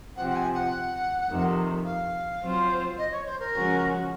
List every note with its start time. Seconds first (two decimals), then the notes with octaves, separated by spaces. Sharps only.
0.16 C3 F3 C4 F#5
0.30 F#5
0.35 G#5
0.54 F#5
1.29 F2 C3 D#3
1.84 F5
2.41 F#3 C4 F4 C5
2.98 D#5
3.12 C#5
3.26 C5
3.39 A#4
3.54 C#3 F3 G#3 C#4 F#4